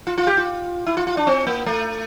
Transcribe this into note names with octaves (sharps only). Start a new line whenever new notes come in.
F4
F4
G4
F4
E4
F4
F4
D4
C4
A#3
A3